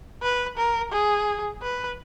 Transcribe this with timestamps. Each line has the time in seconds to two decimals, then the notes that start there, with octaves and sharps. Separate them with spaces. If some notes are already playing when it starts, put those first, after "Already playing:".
0.22 B4
0.57 A#4
0.92 G#4
1.62 B4